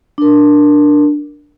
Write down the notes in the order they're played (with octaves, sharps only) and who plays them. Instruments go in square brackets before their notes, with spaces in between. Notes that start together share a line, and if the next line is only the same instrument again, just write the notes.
[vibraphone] D4 A#4